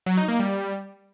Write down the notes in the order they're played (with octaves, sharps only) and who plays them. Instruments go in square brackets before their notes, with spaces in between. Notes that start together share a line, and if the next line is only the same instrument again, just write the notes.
[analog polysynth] F#3
D#4
A#3
G3